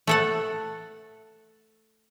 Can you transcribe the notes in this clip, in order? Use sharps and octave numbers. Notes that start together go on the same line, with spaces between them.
A3 A4 F#5